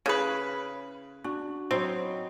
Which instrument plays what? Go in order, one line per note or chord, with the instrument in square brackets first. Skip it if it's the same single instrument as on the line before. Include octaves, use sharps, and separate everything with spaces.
[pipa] C#3 B4 [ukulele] E4 G#4 C#5
[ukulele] D4 [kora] F#4
[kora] F#3 D#4 E4 [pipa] C4